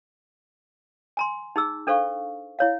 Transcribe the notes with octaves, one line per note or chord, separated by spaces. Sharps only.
G#5 A#5 C6
D#4 G#4 E6
D4 A4 C5 F5 C#6
E4 C#5 F5